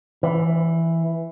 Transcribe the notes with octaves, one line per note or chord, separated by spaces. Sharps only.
E3